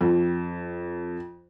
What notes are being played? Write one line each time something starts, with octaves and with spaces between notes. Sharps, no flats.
F2